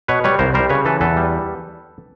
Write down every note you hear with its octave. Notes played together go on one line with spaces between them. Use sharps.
B2 B4 C#5
G3 B4 C#5
C2 A#4 C5
G3 A#4 C5
C#3 B4 C#5
E3 A4 B4
E2 A4 B4
G3